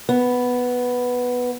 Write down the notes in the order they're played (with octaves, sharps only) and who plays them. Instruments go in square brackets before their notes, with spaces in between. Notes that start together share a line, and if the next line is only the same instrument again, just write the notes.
[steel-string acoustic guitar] B3